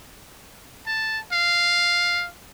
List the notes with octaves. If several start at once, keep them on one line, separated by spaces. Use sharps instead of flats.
A5
F5